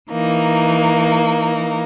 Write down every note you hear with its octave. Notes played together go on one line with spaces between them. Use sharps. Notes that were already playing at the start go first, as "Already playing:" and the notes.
E3 A#3 D#4